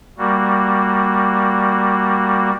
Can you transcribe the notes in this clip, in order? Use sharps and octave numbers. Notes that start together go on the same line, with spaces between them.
G3 A#3 F#4